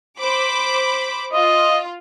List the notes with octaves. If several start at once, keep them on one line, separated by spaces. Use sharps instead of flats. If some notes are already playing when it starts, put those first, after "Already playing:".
C5 B5 D6
F4 D#5